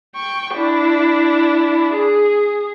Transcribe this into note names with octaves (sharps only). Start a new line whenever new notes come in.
G5 C#6
D4 E4
G#4